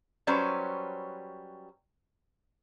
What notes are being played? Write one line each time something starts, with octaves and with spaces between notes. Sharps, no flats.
F#3 G3 C#4 B4 C5